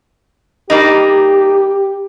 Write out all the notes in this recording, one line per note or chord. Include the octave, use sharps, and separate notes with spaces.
G3 A#3 D#4 G4